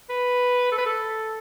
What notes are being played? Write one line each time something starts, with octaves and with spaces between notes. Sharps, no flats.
B4
A4
B4
A4